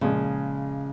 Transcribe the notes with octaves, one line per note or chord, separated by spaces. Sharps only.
A#2 C#3 F3 G#3